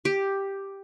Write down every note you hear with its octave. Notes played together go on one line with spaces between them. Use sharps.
G4